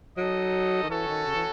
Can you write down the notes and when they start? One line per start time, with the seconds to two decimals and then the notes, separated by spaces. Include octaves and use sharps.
0.17 F#3 D#4 A4 D#5
0.83 D#3
0.89 E3 C#4 F#4 A4
1.08 D#3
1.26 C#3
1.35 E3